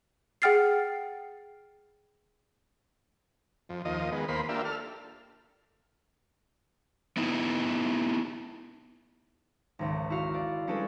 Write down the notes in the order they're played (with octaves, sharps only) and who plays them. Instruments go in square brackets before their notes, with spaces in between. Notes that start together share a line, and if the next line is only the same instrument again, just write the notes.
[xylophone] G#4 F#5 G5 F6 A6 C7
[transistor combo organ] F2
D#2 F3 D#5
D#3 G#3 B3
D#2 A#3 C5 B5
A#3 D4 F4 G4 E5
A4 F6
[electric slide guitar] B3 D#4 E4
[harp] G#1 C#2
E4 F#4 F5
D5
G3 G#3 C#4 D4 A4 B4